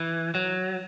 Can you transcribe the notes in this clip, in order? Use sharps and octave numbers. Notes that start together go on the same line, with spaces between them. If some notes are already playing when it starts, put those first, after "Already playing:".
Already playing: E3
F#3